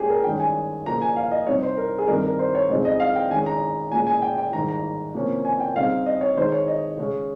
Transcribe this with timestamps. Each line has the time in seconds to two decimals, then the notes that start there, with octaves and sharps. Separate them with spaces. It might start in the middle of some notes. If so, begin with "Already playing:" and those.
Already playing: A#2 G#3 C#4 G4 G#4
0.09 A#4
0.24 G2 D#3 G#3 C#4 G5
0.40 G#5
0.86 C#3 F3 A#3 A#5
1.02 G#5
1.16 F5
1.31 D#5
1.47 C3 G3 C4 D#4 C#5
1.63 C5
1.77 A#4
1.98 G#4
2.08 G2 D#3 G3 C4 D#4 A#4
2.23 A#4
2.39 C5
2.55 C#5
2.70 F2 C#3 G#3 C4 D#4
2.85 D#5
3.00 F5
3.16 G5
3.30 D#3 G#3 C#4 G#5
3.46 A#5
3.92 A#2 G#3 C#4 G#5
4.07 G#5
4.22 G5
4.38 G5
4.53 G#2 D#3 G3 A#5
4.69 A#5
5.14 C3 F3 A#3 C#4
5.45 G#5
5.60 G5
5.76 C#3 G3 C4 D#4 F5
6.06 D#5
6.21 C#5
6.36 D#3 G#3 D#4 C5
6.52 C#5
6.68 D#5
6.98 C#3 G#3 C#4